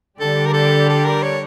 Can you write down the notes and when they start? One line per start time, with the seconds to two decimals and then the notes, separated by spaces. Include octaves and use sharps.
0.20 D3 G3 D4 G4 A4 D5
0.46 A#4
0.54 A4
0.89 A4
1.05 A#4
1.23 C#5